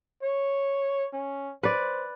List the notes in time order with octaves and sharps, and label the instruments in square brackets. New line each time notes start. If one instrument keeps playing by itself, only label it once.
[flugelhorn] C#5
C#4
[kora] B4 D5 [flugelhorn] C5